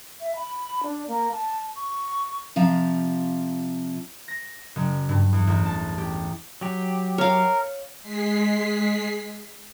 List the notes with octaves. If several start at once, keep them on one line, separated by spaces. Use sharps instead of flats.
E5
B5
D4
A#3
A5
C#6
C3 F3 F5 A#5
A#6
F#1
G2
E2
A1
A5
G4
F#3 G4
A#4 C#5 F5
G#3 B6 C7